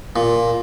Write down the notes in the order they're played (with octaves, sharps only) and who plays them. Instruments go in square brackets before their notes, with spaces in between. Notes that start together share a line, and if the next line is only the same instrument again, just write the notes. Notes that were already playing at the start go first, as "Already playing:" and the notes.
[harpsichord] A#2